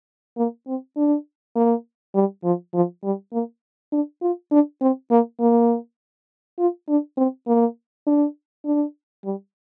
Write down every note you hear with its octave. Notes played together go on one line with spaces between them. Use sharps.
A#3
C4
D4
A#3
G3
F3
F3
G3
A#3
D4
F4
D4
C4
A#3
A#3
F4
D4
C4
A#3
D4
D4
G3